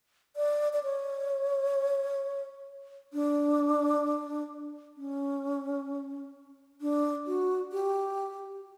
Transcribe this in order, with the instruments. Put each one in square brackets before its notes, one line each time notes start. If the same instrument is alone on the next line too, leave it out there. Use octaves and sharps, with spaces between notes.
[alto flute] D5
D5
C#5
D4
C#4
D4
F#4
G4